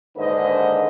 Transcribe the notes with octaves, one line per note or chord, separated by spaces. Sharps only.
D#2 G#2 D3 B4 C5 D#5